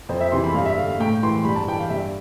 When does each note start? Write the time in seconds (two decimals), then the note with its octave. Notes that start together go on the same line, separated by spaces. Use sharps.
0.09 F2 C5
0.20 E5
0.32 C3 E3 C6
0.44 B5
0.55 G2 F5
0.65 E5
0.77 D3 F5
0.88 F5
0.99 A2 G5
1.23 E3 C6
1.45 G2 B5
1.56 A5
1.67 E3 G5
1.78 F5
1.90 G2 E5